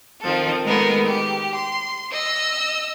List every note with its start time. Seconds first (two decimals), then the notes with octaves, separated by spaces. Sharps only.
0.22 D#3 F3 C4 A4
0.65 D#3 G#3 A3 B3 A#4
1.04 G4
1.55 C6
2.11 D#5 E6